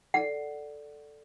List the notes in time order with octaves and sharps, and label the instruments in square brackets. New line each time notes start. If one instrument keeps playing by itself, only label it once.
[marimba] A4 D5 [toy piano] F#5